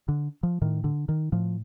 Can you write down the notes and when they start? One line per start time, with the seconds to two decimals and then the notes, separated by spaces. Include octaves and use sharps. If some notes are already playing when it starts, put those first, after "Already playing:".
0.08 D3
0.43 F3
0.62 A2 D#3
0.84 D3
1.09 D#3
1.32 A2 F3